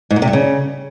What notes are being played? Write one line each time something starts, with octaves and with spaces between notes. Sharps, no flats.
G#2
A#2
C3
G2
C#3